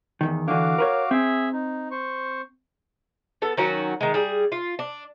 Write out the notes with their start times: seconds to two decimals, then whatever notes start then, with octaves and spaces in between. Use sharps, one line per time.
0.21 E2 G2 D#3
0.48 D3 E3 F#4 F5 D6
0.78 A#4 B4 C#5
1.11 C4 G#4 E5
1.53 D#4
1.91 C5 C#6
3.42 B3 A4
3.57 D#3 F#3 C#4 F#4
4.01 D#3 G#3
4.14 G3 G#4
4.52 F4
4.79 D4